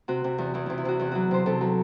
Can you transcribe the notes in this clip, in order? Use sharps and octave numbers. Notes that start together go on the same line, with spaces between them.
C3 F#4
C3
E2
E2 E4
C3 E4
E4
C3 F#4
E2 E4
F#3 F#4
C3 C5
C3 A4
F#3